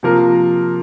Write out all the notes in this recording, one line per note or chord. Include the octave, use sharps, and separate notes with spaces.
C3 F3 A#3 F4 A#4